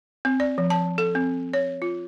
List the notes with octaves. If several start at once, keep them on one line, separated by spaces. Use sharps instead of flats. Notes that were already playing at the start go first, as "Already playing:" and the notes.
C4
D5
F3
A5
A4
C4
C#5
F4